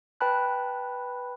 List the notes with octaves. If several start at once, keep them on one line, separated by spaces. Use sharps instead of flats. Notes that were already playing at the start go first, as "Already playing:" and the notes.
B4 G5 A5 B5 F#6